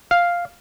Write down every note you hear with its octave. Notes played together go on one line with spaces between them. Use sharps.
F5